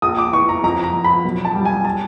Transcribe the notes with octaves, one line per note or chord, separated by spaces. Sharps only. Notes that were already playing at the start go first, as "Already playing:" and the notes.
A#1 D#6
D6
E3 C#6
A#5
F2 A#5
A#5
F3
B5
B1
A5
G3
G#5
A5